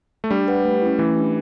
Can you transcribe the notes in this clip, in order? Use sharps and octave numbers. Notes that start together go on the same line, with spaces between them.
A3
G3 D4
G4 B4 F#5
A3
C#4 E4
E3 A3
D4 G4